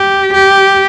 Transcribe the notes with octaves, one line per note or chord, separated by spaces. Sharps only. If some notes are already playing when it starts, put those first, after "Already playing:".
Already playing: G4
G4